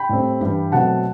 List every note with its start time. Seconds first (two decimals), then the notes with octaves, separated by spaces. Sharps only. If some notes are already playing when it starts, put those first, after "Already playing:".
Already playing: G5 B5
0.09 A2 G3 C4
0.41 G2 E3 G3
0.72 B2 F#3 A3 C4 F#5 A5